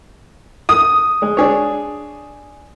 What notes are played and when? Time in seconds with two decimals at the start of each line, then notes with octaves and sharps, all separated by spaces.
0.69 D#6
1.22 G#3
1.37 D4 G#4 C#5